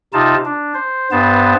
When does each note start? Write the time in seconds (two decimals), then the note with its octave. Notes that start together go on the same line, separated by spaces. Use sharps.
0.13 C3 D#4 F4 A5
0.45 D4
0.74 C5
1.12 G2 B3 C5 A5